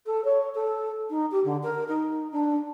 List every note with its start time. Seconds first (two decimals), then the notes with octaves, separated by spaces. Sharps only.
0.06 A4
0.24 C#5
0.54 A4
1.09 D#4
1.31 G4
1.44 D3
1.62 A#4
1.87 D#4
2.31 D4